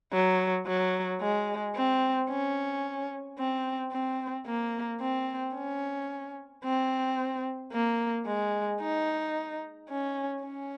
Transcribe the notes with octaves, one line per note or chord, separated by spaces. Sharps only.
F#3
F#3
G#3
C4
C#4
C4
C4
A#3
C4
C#4
C4
A#3
G#3
D#4
C#4
C#4